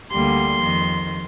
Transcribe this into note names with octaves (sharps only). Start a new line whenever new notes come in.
D2 D3 G3 A#3 C6
F2 D#3